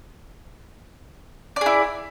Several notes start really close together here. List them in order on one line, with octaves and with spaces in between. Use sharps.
D5 G#4 E4